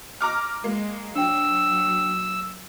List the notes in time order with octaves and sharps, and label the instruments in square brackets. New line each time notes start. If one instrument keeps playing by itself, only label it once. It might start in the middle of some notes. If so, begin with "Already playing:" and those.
[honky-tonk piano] A#5 D6 F6
[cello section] G#3 [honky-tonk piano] A#3
[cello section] F#3 [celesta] D4 G5 [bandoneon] E6